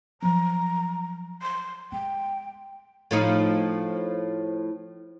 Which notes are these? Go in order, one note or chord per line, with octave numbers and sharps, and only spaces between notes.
F3 F#3 A#5
C6
G#3 G5
A2 F3 D#4